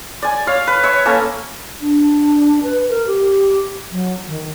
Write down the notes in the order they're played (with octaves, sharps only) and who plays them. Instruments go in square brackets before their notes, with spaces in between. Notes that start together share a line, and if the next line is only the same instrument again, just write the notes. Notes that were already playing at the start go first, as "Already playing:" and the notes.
[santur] D5 G#5
C#5 F5
B4
C#5 E5
A#3 C#4 A4
[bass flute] D4
B4
A#4
G4
F#3
D#3